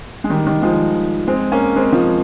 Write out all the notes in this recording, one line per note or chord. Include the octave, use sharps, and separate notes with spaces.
G#3
D#3 G3
D#3 G3
F3 G#3
G#3 C4
A#3 C#4
G#3 C4
F3 G#3